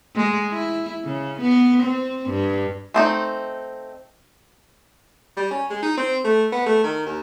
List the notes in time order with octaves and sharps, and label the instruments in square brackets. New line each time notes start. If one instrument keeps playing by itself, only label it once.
[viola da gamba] G#3
E4
C#3
B3
C4
G2
[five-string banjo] A3 C4 D#4
[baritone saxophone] G3
C#4
G#3
D#4
C4
A3
B3
A3
D#3
D#2